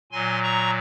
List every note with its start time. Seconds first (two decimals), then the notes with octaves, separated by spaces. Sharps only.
0.12 A#2 F#3 G#5 C6
0.43 A#5 C#6